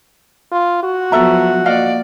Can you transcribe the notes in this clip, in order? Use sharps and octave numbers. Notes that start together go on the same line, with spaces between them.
F4
F#4
F3 F#3 B3 A4 E5 A#5
A#3 D5 D#5 F5 F#5